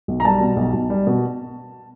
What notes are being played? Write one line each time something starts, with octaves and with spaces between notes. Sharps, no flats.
B1
A#5
G3 A5
B2
B1
B1
G3
B2